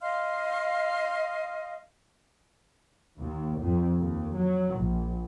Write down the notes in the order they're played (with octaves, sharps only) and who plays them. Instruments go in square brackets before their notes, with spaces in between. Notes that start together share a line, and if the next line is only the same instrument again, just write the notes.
[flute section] D#5 F5 C6 F6
[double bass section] D#2
F2
D#2
F#3
A#1